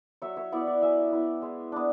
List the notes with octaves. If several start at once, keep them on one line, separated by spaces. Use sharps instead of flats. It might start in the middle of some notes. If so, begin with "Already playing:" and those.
F#3 C#5 E5
C#5 E5
B3 E4 D5 F#5
D5 F#5
F#3 E5 G#5
B3 E4
G#3
B3 D4